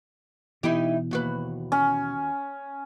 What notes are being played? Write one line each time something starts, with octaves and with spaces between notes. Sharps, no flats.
B2 E3 D#4 E4 G4
D#2 F#4 B4
C#4